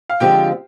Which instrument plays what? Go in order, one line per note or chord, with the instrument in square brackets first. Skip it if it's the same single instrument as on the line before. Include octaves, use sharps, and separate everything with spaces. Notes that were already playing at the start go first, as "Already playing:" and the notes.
[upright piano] F5
[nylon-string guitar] D3 F3 G#3 C4 F4 [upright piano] G4 G5